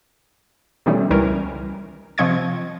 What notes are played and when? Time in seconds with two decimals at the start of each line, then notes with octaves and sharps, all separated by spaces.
0.86 B2 D#3 E3 G3 A3 C#4
1.11 C#2 E3 G3 C#4 A#4
2.18 C3 F3 C4 D#5 C#6 G#6